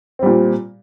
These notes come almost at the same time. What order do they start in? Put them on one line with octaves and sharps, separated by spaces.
C4 G3 A#2